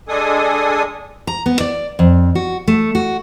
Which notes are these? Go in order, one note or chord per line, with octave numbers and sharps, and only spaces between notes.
G#3 D4 A4 G#5 D#6
A#5
B3
D5
F2
F#4
A3
F#4